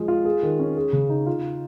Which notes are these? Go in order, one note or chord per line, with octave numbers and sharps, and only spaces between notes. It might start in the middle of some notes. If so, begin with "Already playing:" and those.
Already playing: F3 G#3 G#4
F4
G#4
D#3
C#4
G#4
C#3
D#4
F4